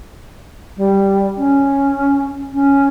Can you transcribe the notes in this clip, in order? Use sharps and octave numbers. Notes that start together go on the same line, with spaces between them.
G3
C#4
C#4